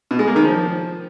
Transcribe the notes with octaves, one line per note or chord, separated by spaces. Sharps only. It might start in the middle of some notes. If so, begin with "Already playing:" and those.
B2
G#3
A#3
D#3
F3